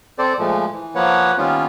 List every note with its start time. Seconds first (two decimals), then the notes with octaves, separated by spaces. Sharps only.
0.19 C4 A4 C5 D5
0.39 A#2 F3 G#3 A3
0.73 E3
0.95 F3 A#3 B4 C#5 F#5
1.38 D#3 G3 A#3 B3 C#4 F4